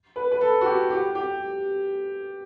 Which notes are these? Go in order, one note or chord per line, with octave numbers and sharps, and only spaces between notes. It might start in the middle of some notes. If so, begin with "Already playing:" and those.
B4
B4
A4
F#4
G4
G4
G4